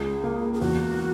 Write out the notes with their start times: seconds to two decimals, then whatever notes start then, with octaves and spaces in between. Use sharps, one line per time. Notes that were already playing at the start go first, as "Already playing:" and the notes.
Already playing: C#2 G#4
0.24 A#3
0.54 G#4
0.61 E2 F#4